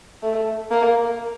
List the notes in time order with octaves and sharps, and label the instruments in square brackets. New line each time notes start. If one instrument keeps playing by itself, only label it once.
[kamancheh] A3
A#3